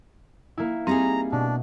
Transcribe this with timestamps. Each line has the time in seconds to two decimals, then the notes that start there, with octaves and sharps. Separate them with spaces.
0.57 A#3 E4
0.87 G3 C4 D#4 G#4 A#5
1.32 B2 D4